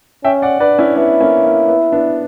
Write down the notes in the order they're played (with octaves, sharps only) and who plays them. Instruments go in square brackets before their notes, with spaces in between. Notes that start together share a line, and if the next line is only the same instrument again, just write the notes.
[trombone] C#4 [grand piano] E5 G5
[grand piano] D5 F#5
[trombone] D4 [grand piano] B4 D5
[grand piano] C#4 E4
[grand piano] B3 D4 [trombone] E4
[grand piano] A#3 C#4
A#3
B3
B3 D4